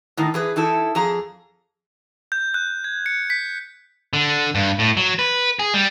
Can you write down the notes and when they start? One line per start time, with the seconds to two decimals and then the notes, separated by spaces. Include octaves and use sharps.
0.17 A2 D#3 D#4
0.34 E3 G#4 B4
0.56 E3 D#4 E4 A4
0.95 F2 G#4 A#5
2.32 G6
2.54 F#6
2.84 G#6
3.06 C#7
3.30 B6
4.13 D3
4.55 G2
4.79 A2
4.97 F#3
5.19 B4
5.59 G#4
5.74 G3